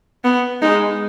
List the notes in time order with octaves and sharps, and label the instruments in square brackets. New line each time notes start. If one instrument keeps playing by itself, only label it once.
[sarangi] B3
[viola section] G#3 [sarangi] D#4